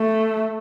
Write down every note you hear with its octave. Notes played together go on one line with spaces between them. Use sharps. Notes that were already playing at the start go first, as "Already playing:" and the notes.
Already playing: A3